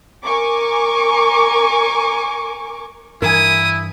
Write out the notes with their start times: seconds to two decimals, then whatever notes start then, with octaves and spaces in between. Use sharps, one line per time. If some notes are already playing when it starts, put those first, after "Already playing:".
0.24 A#4 G#5 C#6 D6
3.22 G2 E3 E4 A#4 G#5 D#6